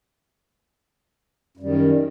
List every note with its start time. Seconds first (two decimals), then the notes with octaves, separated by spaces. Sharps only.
1.57 F#2
1.60 G3
1.63 D#3